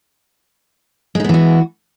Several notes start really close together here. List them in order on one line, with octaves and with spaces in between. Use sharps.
G#3 D#4 B3 E3 F#4